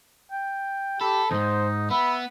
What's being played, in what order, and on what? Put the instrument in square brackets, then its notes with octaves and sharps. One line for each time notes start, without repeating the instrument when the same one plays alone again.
[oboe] G5
[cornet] G4 [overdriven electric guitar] A4 [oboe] B5
[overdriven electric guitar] D#2 G#2 [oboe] D#4 [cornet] C5
[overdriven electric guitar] B3 [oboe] E5 [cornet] B5